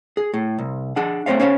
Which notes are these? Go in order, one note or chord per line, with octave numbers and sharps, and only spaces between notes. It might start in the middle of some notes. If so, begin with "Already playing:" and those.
G#4
A2
C2
D4 G#4 F#5
A3 C4 C5 C#5 F5
C#4 C5 C#5 F5